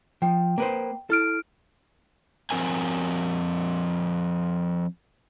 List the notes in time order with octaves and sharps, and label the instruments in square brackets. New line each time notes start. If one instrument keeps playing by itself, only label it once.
[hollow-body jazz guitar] F3 [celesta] G5
[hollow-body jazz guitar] A#3 B4 C5
[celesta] E4 F6 D7 [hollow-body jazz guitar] A4
[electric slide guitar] F3 C4 A#4 G#5